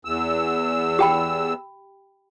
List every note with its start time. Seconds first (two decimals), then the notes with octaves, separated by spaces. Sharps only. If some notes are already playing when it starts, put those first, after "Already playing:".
0.05 E2 E6
0.99 G4 G5 B5